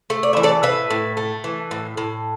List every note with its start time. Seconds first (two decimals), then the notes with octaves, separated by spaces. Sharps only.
0.10 A3
0.23 D5
0.33 E3 E5
0.43 A4 D5
0.63 A2 B4 E5
0.90 A2
1.17 A3
1.44 E3
1.71 A2
1.97 A2